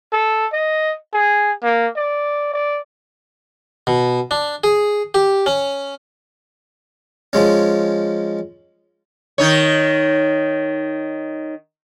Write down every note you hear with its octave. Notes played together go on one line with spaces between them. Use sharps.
A4
D#5
G#4
A#3
D5
D5
B2
D4
G#4
G4
C#4
F3 G#3 C#4
D#3 D#4 C#5